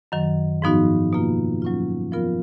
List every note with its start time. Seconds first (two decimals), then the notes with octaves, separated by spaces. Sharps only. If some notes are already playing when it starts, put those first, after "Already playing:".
0.12 F#2 D#3 F#3
0.62 G#2 F3 B3 D#4 F#4
1.13 B2 A#3 F4
1.62 F#3 C#4 F4
2.12 F3 B3 F4 A#4